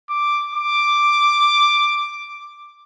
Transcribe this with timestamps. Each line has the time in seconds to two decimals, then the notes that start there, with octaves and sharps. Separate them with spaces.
0.09 D6
0.54 D6